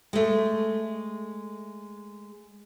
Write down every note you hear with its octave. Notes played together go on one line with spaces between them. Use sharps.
G#3 A3